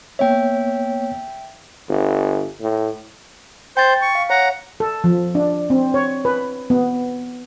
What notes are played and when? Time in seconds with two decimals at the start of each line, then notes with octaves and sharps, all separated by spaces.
0.19 A#3 B3 C#5 E5 G5
1.89 G1
2.61 A2
3.77 C5 G5 G6 A6
4.01 C#6
4.15 F5
4.30 C#5 F#5 A#5
4.80 A4
5.04 F3
5.35 D4
5.70 C4
5.94 C#5
6.25 B4
6.70 B3